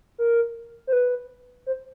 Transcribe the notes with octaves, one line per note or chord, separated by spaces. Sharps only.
A#4
C5
B4
C5